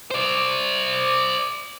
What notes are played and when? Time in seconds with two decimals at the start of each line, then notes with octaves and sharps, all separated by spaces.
0.11 C5 D5